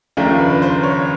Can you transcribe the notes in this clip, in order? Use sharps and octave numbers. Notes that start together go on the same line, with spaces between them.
D#2 C#3 F3 A3 D4 A#4
B4
B4
C5
C#5